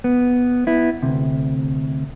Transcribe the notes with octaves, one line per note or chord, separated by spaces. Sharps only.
B3
B3 E4
D2 C3